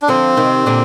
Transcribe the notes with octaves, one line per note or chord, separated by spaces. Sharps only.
D4
D3 F3 C4
C3 D#3
A#2 D3